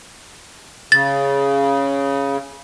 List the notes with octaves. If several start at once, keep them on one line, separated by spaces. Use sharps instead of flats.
C#3 A6